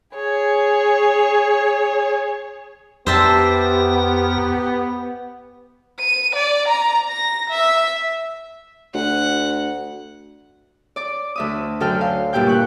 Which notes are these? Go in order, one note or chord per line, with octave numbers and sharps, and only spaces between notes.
G#4 C#5
F2 B3 G4 C5 E5 A5 A#5
D#7
D5
A#5
A#6
E5
D2 F#5
D5 D6
D2 E5 D#6
F#2 D3 A4 G5 F6 G6
F5
G2 A#2 E4 G4 G5 G6
C#6 F#6